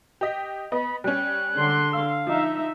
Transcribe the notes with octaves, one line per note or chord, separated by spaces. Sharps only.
G4 D#5 B6
B3 D#5 B5
G3 C#4 F#6
D3 C6
F5 E6
F3 D#4 E5